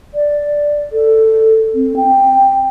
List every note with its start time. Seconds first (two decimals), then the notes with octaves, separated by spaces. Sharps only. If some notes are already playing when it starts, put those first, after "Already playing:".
0.14 D5
0.92 A4
1.75 C4
1.96 G5